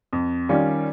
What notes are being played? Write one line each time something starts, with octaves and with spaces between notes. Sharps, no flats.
F2
D#3 G3 C#4 F4